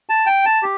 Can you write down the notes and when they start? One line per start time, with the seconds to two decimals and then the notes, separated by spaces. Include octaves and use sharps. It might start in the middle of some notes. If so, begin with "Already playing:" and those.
0.09 A5
0.26 G5
0.46 A5
0.63 G4